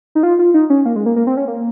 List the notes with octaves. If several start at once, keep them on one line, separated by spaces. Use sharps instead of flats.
D#4
F4
F4
D#4
C#4
A#3
G#3
A#3
A#3
C4
C#4
A#3